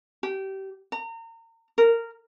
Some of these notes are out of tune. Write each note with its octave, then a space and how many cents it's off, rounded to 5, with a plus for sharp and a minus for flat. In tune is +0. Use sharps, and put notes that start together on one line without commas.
G4 -25
A#5 -35
A#4 -15